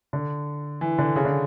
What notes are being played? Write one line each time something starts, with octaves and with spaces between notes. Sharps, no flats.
D3
E3
D3
C#3
D3